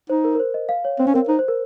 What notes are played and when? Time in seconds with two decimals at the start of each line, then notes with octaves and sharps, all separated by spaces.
0.09 D#4 C5
0.24 A#4
0.35 A#4
0.40 C5
0.54 D#5
0.69 F5
0.85 C#5
0.99 C4 C5
1.07 C#4
1.14 C4 A#4
1.28 D#4 C5
1.39 C5
1.48 A#4